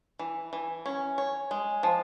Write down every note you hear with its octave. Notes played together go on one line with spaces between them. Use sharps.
E3
E3
C#4
C#5
G#3
F3